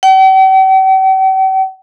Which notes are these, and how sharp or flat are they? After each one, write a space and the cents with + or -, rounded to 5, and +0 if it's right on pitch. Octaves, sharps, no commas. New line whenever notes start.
G5 -45